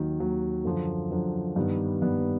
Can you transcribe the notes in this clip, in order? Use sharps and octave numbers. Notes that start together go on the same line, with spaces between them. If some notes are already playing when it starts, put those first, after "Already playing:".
Already playing: D#2 D#3 F#3
D#2 D#3 F#3
F#2 D3 F3
F#2 D3 F3
G2 D#3 G3 B3
G2 D#3 G3 B3